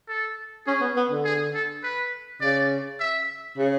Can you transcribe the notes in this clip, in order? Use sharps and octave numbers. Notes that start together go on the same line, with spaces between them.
A4
C#4 G#4
B3
B3
D3
G#4
A4
B4
C#3 D5
E5
C#3